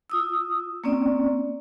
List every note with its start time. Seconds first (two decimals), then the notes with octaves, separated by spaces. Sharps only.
0.10 F4 D#6 E6
0.84 A#3 C4 C#4 D5